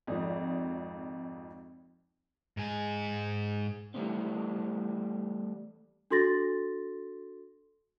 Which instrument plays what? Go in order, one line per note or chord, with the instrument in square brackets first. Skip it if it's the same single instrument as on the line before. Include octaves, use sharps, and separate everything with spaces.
[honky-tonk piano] G#1 F2 F3
[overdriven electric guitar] G#2 G#4
[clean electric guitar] E3 F3 G3 A3 B3 C4
[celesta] D4 F#4 A4 C6 A6 A#6